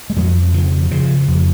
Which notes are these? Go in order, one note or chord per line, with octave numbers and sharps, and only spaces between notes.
G#3
F2 F#3
C#3 F3
C#3 F3
F2